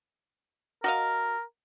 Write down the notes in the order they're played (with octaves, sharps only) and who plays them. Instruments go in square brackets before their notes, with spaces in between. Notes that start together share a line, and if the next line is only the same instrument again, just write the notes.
[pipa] F#4 D#5 F5 [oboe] A#4